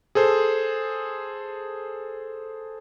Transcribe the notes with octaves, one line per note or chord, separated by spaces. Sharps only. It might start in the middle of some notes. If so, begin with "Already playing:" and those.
G#4 A4 C5